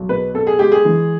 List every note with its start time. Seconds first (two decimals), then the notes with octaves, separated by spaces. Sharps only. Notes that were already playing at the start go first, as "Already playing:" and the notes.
Already playing: B1
0.09 B2 B4
0.34 B3 A4
0.47 G#4
0.59 G#3 G4
0.72 G#4
0.85 E3